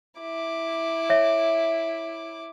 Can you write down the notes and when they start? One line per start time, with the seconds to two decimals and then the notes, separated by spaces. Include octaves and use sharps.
0.20 E4 D6
1.10 C#5 E5